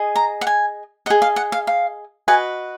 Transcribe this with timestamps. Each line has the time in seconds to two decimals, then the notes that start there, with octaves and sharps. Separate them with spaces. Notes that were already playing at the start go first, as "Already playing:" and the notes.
Already playing: G#4 D#5
0.16 A#5
0.41 F#5
0.47 G#5
1.06 G#4 D#5 F#5
1.22 F5
1.36 F#5
1.52 F5
1.67 F5
2.28 F#4 B4 D#5 G#5